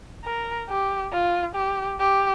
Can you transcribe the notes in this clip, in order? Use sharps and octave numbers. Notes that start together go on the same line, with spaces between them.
A#4
G4
F4
G4
G4